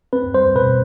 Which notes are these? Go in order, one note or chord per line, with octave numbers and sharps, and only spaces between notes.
C4 B4
G3 C5
B2 B4